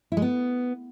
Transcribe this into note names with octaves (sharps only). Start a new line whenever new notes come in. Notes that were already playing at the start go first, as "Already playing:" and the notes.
E4
G#3
B3